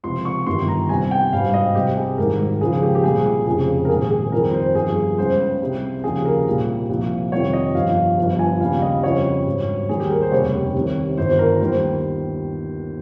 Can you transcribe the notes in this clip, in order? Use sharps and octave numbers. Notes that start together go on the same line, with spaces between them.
C#2 C3 F3 C6
C#6
G1 G2 D#3 G3 C6
A#5
C2 C3 G3 G#5
G5
G#1 G2 G3 F5
D#5
C2 C3 G3 G4
G#4
G#1 G#2 D#3 G3 A#4
C#2 C#3 F3 G#4
G4
G4
C2 A#2 G3 G#4
F1 F2 C#3 F3 G#4
A#4
A#1 G#2 D#3 G#4
G#4
G#4
F2 D#3 G3 A#4
C5
G1 G2 F3 G#4
C#2 C#3 G3 C5
C2 C3 G3
D#2 C#3 F3 G#4
A#4
C2 A#2 G3
C2 A#2 F3
F2 C3 D#3 G3 C#5
D#5
G1 G2 F3 F5
G1 G2 F3
G#5
D#2 C#3 G3 F5
D#5
F2 C#3 G3 C#5
G#1 G2 G3
D#2 D#3 G3 G#4
G4
A#4
C5
F1 D#2 C#3 G3 C#5
C2 C3 D#3
G1 G2 D#3 C5
A#4
D#2 D#3 G3 C5